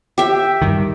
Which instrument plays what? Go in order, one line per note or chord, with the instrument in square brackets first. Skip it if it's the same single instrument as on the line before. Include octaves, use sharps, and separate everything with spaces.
[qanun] G4 E5
[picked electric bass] G2 D#3